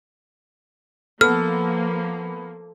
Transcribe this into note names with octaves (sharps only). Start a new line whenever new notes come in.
F3 A#3 B3 A4 F6